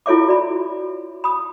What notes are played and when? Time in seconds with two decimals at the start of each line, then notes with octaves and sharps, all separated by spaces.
0.06 E4 F4 A4 C#5 E5 D6
0.27 F#4 D5 B5
1.24 B5 D#6